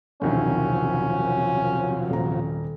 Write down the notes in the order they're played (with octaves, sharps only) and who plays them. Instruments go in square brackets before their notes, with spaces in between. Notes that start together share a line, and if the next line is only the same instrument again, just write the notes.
[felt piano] E1 C2 D#3 [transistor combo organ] C3 F3 F#3 [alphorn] C#4
[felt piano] D#1 A#5